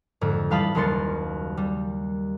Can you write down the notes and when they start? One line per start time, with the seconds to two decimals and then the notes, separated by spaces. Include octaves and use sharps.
0.21 F2 G#2 D3
0.51 E3 G3 F5 A5 B5 D#6
0.75 F#1 D#2 G3 C6 A6 C#7
1.57 G3